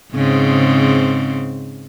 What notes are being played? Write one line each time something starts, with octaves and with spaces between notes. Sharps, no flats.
G#2 C#3 C4